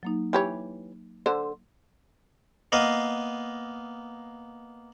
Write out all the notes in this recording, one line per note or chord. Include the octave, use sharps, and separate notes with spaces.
F#3 A#3 D#4
E3 G4 C#5 B5
D3 A4 C5
A#3 B3 D#5 F5